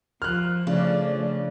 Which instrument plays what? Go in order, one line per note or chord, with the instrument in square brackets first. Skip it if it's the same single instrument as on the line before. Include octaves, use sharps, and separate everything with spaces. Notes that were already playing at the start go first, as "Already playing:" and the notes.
[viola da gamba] F3 [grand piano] F6 F#6
[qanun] C#3 [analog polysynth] F3 D4 D5 [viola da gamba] A3